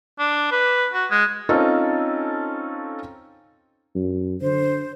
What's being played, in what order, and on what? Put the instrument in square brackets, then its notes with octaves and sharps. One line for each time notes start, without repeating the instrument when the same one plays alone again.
[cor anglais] D4
B4
F#4
G#3
[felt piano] C4 C#4 D#4 F4 A4
[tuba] F#2
[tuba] D3 [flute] C5